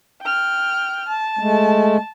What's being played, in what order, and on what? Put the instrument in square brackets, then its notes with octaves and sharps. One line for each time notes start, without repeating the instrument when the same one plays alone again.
[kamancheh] G5 F6
A5
[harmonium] G#3 A3